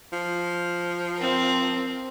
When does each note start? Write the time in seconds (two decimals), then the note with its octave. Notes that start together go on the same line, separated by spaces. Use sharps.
0.13 F3
1.16 C4 A#4